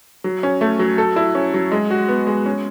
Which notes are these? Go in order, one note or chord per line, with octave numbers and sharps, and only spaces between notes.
F#3
C#4
A3
F#3
A4
E4
C#4
F#3
G#3
F#4
B3
G#3
C#4